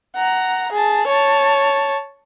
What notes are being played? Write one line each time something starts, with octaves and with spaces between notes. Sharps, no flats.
F#5 A#5
G#4 A5
C#5 A5